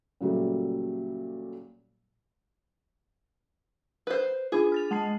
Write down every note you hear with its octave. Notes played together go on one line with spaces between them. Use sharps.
A#2 C#3 F#3 G3 A3
B4 C5
D4 F4 G#4
F6 A6 F7
G#3 F#5 A5 C7